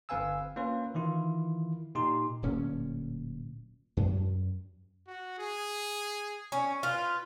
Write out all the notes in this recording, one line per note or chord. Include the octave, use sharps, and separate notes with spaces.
G1 C4 B4 F5 G#5 E6
A#3 C#4 F4 B4
D#3 E3 E4 F4
A#2 D#4 G4 C6
D1 A#2 C#4
F#2
F#4
G#4
C#4
F4 B4